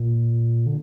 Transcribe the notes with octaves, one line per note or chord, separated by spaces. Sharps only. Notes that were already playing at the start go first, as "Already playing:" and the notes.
Already playing: A#2
D3